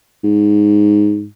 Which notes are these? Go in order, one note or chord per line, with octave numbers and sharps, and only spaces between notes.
G#2